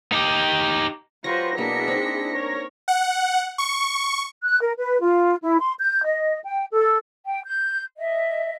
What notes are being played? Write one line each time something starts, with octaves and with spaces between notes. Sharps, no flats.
D#4 G4
F#3 F4 G4 B4 C5 C#6 A#6
B2 A#3 D4 E4 G#4 A#5 B6 C#7
C4 D#4
A#4 C#5
F#5
C#6
F#6
A#4
B4
F4
E4
C6
G6
D#5
G5
A4
G5
G6
D#5 E5